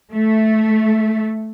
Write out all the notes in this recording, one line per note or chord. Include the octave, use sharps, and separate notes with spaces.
A3